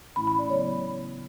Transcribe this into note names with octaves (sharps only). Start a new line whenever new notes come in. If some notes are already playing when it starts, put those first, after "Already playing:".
A2 E3 A3 C#4 E4 B5
B5
D5
C#3 F#3 B3 C#5